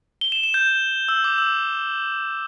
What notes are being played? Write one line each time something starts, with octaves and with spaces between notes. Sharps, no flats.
G7
E7
E7
G6
E6
D6
E6